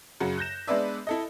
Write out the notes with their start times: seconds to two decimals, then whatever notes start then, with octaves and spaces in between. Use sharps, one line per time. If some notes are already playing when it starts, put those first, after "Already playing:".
0.20 F#2 C#3 F#4
0.37 F#6 G6 A#6 E7
0.67 G#3 B3 D4 B4 D5 E5
1.07 E4 A4 D#5